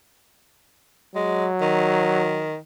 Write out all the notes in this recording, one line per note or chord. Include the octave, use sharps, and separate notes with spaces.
F#3 G#3
D#3